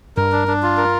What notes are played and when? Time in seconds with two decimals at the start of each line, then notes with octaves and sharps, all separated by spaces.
0.17 G2 A#4
0.32 D4
0.48 D4
0.63 F4
0.77 A#4